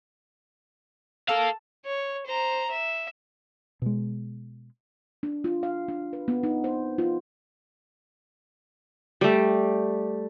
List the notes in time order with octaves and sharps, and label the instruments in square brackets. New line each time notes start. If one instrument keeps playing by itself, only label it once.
[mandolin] A4 [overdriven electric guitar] A#4 F5
[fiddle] C#5
C5 A#5
E5
[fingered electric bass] B2 G#3
[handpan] D4
F4
F5
D4
B4
B3
D#4
C5
F4
[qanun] G3 A3